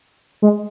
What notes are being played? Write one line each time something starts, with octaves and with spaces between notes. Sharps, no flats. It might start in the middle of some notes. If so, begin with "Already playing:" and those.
G#3